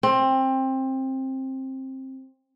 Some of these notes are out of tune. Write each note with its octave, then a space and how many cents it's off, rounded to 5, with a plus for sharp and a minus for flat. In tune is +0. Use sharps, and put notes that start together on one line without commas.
C4 +20